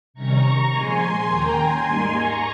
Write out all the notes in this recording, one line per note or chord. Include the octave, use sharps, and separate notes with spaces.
C3 D#3 G3 C#4 A#5 C#6
A#2 F3 G#3 G#5 C6
D#2 D#3 A#3 C#4 G5 A#5
G#5 C6
G#2 G3 A#3 D#4
A#5 C#6